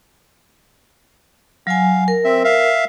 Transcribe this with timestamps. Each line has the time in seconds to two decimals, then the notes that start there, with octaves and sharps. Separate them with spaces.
1.67 F#3 F5 G#5
2.08 A#4
2.24 C4 E5
2.44 E5 F5